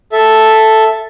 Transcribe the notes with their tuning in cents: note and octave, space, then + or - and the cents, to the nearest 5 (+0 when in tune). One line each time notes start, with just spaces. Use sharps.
A4 +0 E5 +0